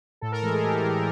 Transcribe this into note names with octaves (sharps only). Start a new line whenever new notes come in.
A2 A4
A#4
E3 G#3 A4
G#4
A2 G4
E3 G#3